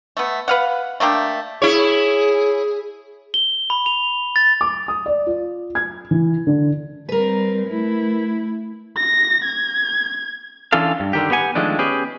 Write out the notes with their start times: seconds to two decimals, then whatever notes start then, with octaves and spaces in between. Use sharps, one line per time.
0.17 A3 B3
0.48 B4 F5 F#5
1.00 A3 A#3 D4 G4
1.62 E4 G#4 C#5
3.34 G7
3.70 B5
3.86 F7
4.36 A6
4.61 D6
4.88 D#6
5.06 D5
5.26 F4
5.75 G#6
6.11 E3
6.47 D3
7.09 G3 C4 A#4 B4
7.66 A3 E4
8.97 A#6
9.45 G#6
10.73 E3 C#4 D4 F4 A4 F5
11.00 G2
11.13 D3 D#3 G4
11.31 B3 G4 F#5 G#5
11.55 D#3 F3 G#3 A3 D4
11.79 B3 C#4 G4 G#4